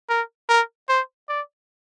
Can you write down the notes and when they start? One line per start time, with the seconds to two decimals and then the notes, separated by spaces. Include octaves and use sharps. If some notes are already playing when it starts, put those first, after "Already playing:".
0.10 A#4
0.49 A#4
0.89 C5
1.29 D5